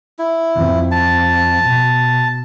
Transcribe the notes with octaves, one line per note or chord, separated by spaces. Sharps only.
E4
F2
A5
B2